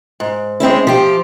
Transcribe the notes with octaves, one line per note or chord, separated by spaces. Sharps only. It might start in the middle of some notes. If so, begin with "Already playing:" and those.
G#2
G#3 C4 C#4 E4
F3 G4